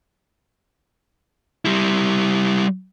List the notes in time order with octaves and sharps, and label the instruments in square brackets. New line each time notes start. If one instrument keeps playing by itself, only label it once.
[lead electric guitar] G3 E4